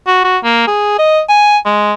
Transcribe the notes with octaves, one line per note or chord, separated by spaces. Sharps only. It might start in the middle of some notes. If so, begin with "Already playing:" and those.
F#4
F#4
A#3
G#4
D#5
G#5
G#3